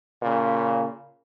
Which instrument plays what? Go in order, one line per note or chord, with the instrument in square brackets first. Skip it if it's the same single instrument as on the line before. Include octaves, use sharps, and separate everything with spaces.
[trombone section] A#2 C#3